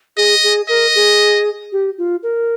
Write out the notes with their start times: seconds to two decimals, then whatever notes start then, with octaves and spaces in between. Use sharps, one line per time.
0.17 G#4 D#5
0.43 G#4
0.69 A#4 D#5
0.95 G#4
1.72 G4
1.98 F4
2.23 A#4